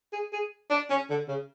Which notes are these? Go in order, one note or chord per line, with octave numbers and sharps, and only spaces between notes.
G#4
G#4
D4
C#4
D3
C#3